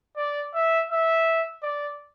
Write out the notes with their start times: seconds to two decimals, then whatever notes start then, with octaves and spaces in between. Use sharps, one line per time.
0.17 D5
0.54 E5
0.90 E5
1.63 D5